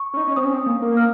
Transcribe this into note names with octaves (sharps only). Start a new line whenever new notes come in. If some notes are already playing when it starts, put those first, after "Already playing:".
Already playing: C#6
C#4
D#4
C#4
C4 D#6
C#4
C4
A#3
A#3
F6